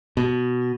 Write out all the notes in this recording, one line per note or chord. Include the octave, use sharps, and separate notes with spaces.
B2